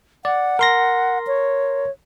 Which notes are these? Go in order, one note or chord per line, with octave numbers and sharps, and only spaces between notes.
D5 F#5
A#4 C6 A#6
C#5